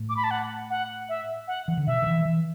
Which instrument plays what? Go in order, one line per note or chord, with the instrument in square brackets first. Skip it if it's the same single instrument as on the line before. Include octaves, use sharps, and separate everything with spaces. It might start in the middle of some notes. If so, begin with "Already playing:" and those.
Already playing: [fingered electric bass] A2
[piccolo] D6
B5
A5
F#5
F#5
E5
F#5
[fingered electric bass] E3
D3
[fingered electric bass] B2 [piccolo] E5
[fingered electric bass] D3
E3
E3